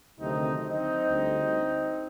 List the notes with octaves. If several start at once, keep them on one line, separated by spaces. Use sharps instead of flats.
D2 C3 D#3 F#3 A3 C4 D#4
C4 D#4
D2 D3 G3